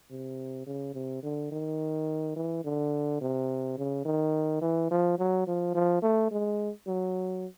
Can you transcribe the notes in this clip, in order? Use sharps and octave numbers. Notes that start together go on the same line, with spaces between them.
C3
C#3
C3
D3
D#3
E3
D3
C3
C#3
D#3
E3
F3
F#3
F3
F3
A3
G#3
F#3